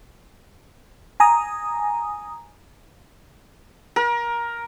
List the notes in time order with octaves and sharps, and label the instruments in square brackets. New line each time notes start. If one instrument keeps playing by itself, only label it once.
[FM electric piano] G#5 A#5 D#6
[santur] A#4